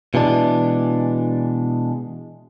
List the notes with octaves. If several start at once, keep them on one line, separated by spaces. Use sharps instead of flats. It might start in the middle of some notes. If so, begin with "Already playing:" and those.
B2 E3 G#3 D4